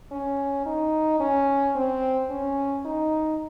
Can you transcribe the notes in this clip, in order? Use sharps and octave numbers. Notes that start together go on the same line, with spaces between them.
C#4
D#4
C#4
C4
C#4
D#4